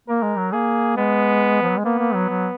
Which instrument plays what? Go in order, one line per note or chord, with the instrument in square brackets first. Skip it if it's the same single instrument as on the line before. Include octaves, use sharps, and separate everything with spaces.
[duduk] A#3 [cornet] A#4
[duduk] G#3
F#3
[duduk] A#3 [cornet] G#4
[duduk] G#3 [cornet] B3
[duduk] F3
F#3
G#3
[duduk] A#3 [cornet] B3
[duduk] A#3
F#3
F#3